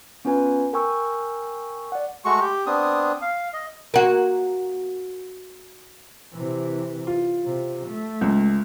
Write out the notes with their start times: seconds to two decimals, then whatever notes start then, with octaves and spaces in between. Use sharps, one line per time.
0.25 B3 C#4 F4 B4 G#5
0.73 A#4 G5 G#5 C#6 E6
1.92 D5 F#5
2.25 G#3 A3 F#4 C#6
2.41 G4
2.66 B3 C4 D4 D#6
3.22 F5
3.53 D#5
3.94 A#3 F#4
6.33 C3 E3
7.07 F4
7.44 C3
7.88 A3
8.21 C#2